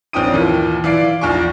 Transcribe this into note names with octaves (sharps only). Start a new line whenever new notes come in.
A#1 C4 C#4 G5 D#6 D#7
D#2 A#2 E3
E3 D5 F5 C7 D7
A#1 E2 F4 G#5 C#6